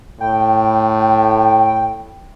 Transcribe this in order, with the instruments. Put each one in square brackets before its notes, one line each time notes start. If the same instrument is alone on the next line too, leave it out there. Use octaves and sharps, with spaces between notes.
[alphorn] A2 [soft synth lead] G5